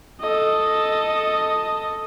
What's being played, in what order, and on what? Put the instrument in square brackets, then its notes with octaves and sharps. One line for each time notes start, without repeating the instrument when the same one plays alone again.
[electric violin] A4 D#5